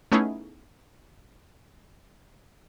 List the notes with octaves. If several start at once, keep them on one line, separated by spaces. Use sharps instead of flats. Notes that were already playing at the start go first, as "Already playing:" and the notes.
A3 B3 C#4 D#4 E4 G#4